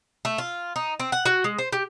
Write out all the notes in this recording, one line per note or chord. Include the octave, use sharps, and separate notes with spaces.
A3
F4
D#4
C4
F#5
F#4
G#3
C5
G4